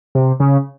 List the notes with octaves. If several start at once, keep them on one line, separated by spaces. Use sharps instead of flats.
C3
C#3